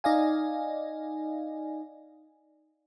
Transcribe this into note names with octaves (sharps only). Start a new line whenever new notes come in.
D#4 D5 D#5 F5 G#5